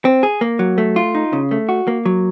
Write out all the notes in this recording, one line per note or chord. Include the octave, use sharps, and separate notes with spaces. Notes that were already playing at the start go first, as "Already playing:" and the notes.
C4
G#4
A#3
F#3
A3
F4
D#4
C#3
A3
F#4
A#3
F#3